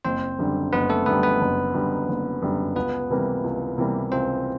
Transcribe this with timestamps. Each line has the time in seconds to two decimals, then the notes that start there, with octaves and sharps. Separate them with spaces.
0.05 F#1 C4 C5
0.39 F#2 D3 G3
0.73 F#1 B3 B4
0.89 A3 A4
1.06 F#2 D3 G3 B3 B4
1.23 B3 B4
1.41 F#1
1.74 F#2 D3 G3
2.08 F#1
2.42 F#2 D3 G3
2.76 C#2 B3 B4
3.10 C3 E3 G3 A#3
3.44 C#2
3.78 C3 E3 G3 A#3
4.12 C#2 C4 C5